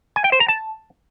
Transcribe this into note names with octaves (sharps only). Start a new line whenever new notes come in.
G#5
G5
C5
A#5
A5